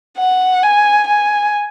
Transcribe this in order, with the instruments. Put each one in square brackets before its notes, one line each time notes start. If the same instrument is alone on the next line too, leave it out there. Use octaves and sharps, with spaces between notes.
[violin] F#5
G#5
G#5